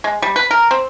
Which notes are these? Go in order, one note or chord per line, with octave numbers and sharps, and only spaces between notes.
G#3
G3
B4
A#4
C4